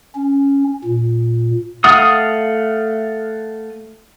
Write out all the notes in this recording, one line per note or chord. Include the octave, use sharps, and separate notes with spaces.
C#4
A#2
A3 F5 F#5 D#6